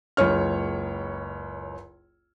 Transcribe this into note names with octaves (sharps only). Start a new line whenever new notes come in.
F#1 C#2 C#5 F6